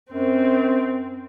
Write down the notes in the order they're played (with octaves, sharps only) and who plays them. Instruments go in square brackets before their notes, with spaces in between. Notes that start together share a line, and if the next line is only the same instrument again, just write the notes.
[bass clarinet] F#2 [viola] C4